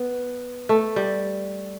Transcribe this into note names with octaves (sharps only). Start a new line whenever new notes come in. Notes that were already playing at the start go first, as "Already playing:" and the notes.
Already playing: B3
A3
G3